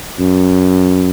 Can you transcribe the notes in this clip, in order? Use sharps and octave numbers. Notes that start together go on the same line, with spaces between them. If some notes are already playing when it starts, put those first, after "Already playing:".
F#2